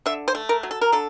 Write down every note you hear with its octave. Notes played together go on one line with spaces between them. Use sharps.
D3 E5
C5
A3
A#4
F#3
A4
A#4
D3 A4